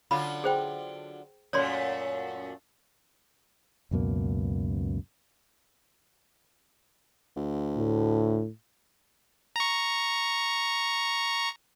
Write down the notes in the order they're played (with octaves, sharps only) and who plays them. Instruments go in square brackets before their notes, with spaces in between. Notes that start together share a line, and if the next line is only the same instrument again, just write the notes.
[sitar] D3 F#3 F4 [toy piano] B5
[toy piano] G#4 C5 G5
[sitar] F#2 A#2 A3 [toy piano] C#5 D5 C6
[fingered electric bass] C#2 F#2 B2 A#3
[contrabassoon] D2
[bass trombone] A2
[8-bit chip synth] A#5 C#6